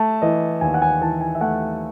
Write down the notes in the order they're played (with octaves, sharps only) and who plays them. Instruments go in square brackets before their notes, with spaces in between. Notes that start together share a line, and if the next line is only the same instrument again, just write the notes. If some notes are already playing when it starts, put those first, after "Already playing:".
Already playing: [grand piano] A3 A5
E3 D#5
D#2 G#5
F#5
G#5
E3 A5
G#5
E5
A3 F#5